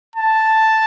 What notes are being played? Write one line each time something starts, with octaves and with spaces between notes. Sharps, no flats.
A5